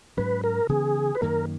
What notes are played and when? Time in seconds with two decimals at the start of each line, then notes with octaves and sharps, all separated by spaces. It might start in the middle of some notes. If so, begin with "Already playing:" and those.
0.17 G#2 F#3 C#4 B4
0.44 A#4
0.69 C#3 E3 B3 G#4
1.15 B4
1.22 F#2 D#3 A#3 A#4